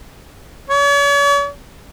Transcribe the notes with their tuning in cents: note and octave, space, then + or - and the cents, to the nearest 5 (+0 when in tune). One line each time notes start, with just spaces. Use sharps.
C#5 +45